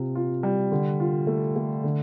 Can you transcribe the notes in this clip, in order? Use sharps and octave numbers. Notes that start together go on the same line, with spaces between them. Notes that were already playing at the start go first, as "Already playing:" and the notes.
Already playing: C3 F4
F4
G3
D3
F4
A3
A3
D3